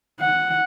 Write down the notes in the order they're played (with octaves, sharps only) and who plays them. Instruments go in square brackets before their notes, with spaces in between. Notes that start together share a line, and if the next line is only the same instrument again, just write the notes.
[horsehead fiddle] F#5